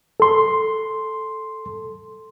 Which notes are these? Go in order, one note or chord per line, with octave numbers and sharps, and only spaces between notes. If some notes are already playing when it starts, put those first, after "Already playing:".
A4 C6